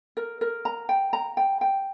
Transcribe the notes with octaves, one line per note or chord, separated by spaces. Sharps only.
A#4
A#4
A#5
G5
A#5
G5
G5